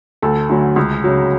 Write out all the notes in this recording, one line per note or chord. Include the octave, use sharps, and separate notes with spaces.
D2 A4
D3 F#3 A3
C#2
C#3 F#3